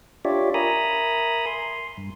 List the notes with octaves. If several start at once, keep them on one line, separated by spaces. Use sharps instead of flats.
D4 F4 G4 C#5 D5 E5
A#4 E5 G#5 A#5 B5 D#6
C6
G2